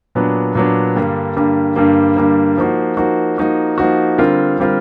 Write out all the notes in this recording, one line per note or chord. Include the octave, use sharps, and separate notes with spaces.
A#2 F#3 B3 D4
A#2 F#3 B3 D4
G2 D3 G3 A#3
G2 D3 G3 A#3
G2 D3 G3 A#3
G2 D3 G3 A#3
F3 A#3 D#4 F#4
F3 A#3 D#4 F#4
F3 A#3 D#4 F#4
F3 A#3 D#4 F#4
D3 G3 C4 F4 A#4
D3 G3 C4 F4 A#4